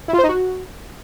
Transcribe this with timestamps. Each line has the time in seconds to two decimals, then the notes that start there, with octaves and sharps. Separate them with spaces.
0.08 E4
0.13 F4
0.18 C5
0.24 D#4
0.29 F#4